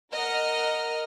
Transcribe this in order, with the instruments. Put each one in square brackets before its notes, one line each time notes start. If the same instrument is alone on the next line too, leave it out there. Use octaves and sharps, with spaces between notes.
[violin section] A#4 D#5 F#5 F6